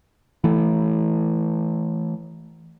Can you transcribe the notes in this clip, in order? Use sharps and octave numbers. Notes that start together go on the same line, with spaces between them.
E3 A3